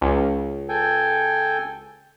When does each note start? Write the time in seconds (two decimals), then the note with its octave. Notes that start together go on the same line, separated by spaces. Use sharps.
0.01 C#2
0.69 A4 G5 G#5